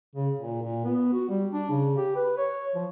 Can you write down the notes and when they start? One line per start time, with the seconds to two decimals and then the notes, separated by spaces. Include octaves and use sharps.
0.15 C#3
0.39 A#2
0.62 A#2
0.85 B3
1.13 F#4
1.29 G3
1.52 D4
1.70 C#3
1.97 G4
2.16 B4
2.38 C#5
2.75 F3